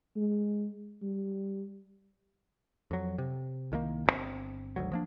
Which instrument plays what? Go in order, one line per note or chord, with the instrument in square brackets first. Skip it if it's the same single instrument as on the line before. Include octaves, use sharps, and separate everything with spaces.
[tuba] G#3
G3
[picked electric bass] F2 F#3
C3
C2 D#3 F3 A#3
G1 C3 C4
G#1 D2 F#3
F3 A#3 D4